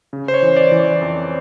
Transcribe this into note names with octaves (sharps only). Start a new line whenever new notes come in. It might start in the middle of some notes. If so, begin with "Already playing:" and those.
C#3
C5
C#5
E3
D5
E3
D5
F2